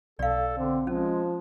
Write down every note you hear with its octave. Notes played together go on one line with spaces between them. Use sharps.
B1 A4 D5 F5
D3 C4
F3 G#3 C#4